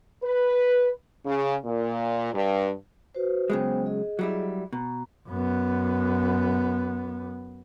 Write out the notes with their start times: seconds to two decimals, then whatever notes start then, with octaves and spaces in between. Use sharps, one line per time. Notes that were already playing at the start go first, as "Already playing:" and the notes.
0.24 B4
1.25 C#3
1.65 A#2
2.33 G2
3.15 F#4 B4 C5
3.50 C#3 F#3 G#3 B3 C5 G5
3.86 G#4 D#5
4.19 F#3 G3 E4
4.73 B2 A#5
5.28 F#2 B3